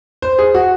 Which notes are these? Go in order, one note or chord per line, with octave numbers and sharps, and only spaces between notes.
C5
G#4
F#4